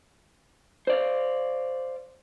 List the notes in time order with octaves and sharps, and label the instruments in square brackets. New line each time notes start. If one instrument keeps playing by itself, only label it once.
[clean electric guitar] C5 D5 F5